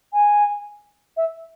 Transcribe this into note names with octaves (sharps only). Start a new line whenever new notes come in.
G#5
E5